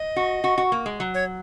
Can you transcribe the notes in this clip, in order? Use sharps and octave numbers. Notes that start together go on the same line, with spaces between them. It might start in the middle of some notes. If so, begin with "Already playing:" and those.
Already playing: D#5
F#4
F#4
F#4
A#3
G#3
F#3
C#5